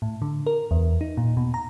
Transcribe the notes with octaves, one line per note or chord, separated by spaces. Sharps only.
A2
D3
A#4
E2
D#4
A#2
B2
A#5